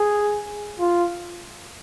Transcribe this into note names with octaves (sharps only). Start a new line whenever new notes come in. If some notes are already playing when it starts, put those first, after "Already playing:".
Already playing: G#4
F4